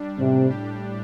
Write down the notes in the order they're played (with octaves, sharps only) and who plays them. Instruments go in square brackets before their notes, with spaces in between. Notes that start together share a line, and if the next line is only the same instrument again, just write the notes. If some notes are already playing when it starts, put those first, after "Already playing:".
Already playing: [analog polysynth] G3 D4
[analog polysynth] A2 [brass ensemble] C3
[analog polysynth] G4